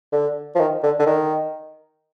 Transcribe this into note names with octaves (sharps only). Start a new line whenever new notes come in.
D3
F3
D#3
D3
D3
D#3